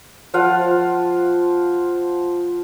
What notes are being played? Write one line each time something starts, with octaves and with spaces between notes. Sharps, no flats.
F3 F4 F5 F#5